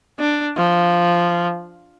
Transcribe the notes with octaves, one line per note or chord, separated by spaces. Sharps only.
D4
F3